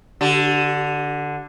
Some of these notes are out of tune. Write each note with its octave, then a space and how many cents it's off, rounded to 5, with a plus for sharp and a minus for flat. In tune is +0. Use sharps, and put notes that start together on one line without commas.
D3 +0 G4 -40